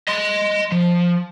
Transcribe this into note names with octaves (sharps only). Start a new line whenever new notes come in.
D#5 C6
F3